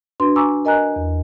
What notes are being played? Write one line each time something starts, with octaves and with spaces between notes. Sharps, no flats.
D4 F#4 B4 C6
G#5 A#5 C#6 D6 E6
A#4 D#5 G#5 A#5 F#6
E2